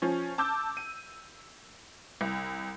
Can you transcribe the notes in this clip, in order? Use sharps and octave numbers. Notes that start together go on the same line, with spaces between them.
F3 C#4
A5 D6 E6 G6
D#7
C2